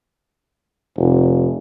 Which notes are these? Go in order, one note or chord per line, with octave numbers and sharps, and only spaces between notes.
F1